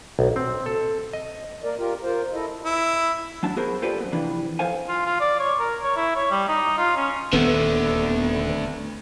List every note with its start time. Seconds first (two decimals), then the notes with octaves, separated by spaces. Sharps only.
0.19 B1
0.36 C4
0.66 A4
1.13 D#5
1.64 A#3 A#4 D5
1.78 F4 G4 A#4
2.03 F4 A#4 C5
2.33 E4 A4 D#5
2.65 E4
3.43 F#3 D4 A5
3.56 B3 F#4 G#4 A#4 C5 B5
3.82 F4 G4 A4 B4 C5 D5
4.00 F#2 B3
4.12 C3 E3 F3 D4 B4
4.59 F2 A4 C5 F5 G#5
4.88 F4
5.06 F4
5.20 D5
5.39 C#5
5.59 A#4
5.82 C#5
5.96 E4
6.16 C#5
6.31 G3
6.48 D#4
6.78 F4
6.96 C#4
7.33 D#1 D#2 D3 A3 B3 C4